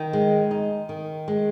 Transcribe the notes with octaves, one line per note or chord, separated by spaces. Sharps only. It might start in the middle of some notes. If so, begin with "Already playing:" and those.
Already playing: D#3
G#3
D#4
D#3
G#3